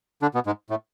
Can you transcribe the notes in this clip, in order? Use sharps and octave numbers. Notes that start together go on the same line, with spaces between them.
D3 D4
B2 B3
G#2 G#3
A2 A3